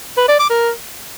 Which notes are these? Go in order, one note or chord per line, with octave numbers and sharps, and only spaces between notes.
B4
D5
D6
A#4